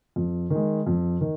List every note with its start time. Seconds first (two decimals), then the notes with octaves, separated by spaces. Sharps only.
0.16 F2
0.50 D#3 G#3
0.87 F2
1.21 D#3